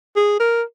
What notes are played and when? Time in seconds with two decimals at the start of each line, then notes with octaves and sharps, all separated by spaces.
0.16 G#4
0.40 A#4